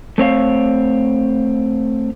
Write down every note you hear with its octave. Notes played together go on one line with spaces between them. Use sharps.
A3 C4 C#5 F5